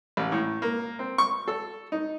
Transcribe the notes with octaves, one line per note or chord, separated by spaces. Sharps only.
A1
A2
A#3
C4
C#6
A4
D#4